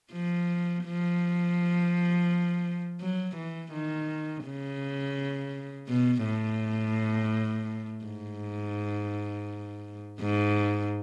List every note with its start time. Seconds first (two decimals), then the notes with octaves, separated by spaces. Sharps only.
0.13 F3
0.85 F3
3.01 F#3
3.37 E3
3.73 D#3
4.45 C#3
5.89 B2
6.25 A2
8.05 G#2
10.21 G#2